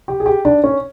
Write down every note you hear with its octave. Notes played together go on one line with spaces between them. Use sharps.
G4
G#4
G4
D4
C#4